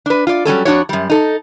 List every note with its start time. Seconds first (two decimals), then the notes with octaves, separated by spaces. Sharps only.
0.06 D4 B4
0.27 F4 D5
0.45 F#3 G3 C#4 A4
0.65 F2 D4 F#4 C#5
0.89 F#2 G3
1.10 D#4 A4